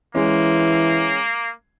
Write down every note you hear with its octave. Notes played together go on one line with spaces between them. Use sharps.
E3 G#3 A#3 C#4